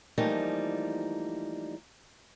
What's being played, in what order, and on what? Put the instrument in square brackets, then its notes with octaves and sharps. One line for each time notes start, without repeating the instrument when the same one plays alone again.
[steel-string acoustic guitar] E3 F3 G3 A3 A#3 D#4